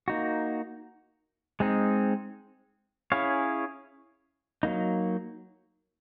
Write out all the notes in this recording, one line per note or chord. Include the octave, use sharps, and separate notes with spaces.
A#3 D#4 F#4
G#3 C4 D#4
C#4 E4 G#4 C#5 F5
F#3 A#3 D#4